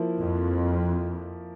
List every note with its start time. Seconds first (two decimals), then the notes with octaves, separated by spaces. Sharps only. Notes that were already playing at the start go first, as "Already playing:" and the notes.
Already playing: F3 A#3 E4
0.18 F2